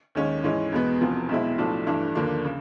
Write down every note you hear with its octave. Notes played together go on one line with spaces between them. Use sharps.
D#2 D#3 G#3 C#4
G#2 E3 G#3 C#4
E2 B2 G#3 B3
E1 E2 C3 F3
B1 B2 G#3 C4 E4
B1 A2 F3 A3 D4
G2 E3 A3 D4
D#2 D3 F3 A#3 D4
C#3